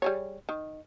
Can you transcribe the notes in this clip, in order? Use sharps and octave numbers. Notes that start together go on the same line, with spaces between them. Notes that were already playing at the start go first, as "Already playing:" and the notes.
G3 G#4 C#5
D#3